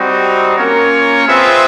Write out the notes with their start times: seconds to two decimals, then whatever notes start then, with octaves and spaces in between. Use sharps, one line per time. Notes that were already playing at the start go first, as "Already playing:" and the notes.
Already playing: G3 C4 D#4 F#4
0.57 A#3 C#4 F4 A#4 C#5
1.28 C4 F4 G#4 B4 E5